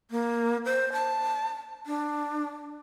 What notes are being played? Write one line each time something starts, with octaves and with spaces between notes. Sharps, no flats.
A#3
C5
A5
D4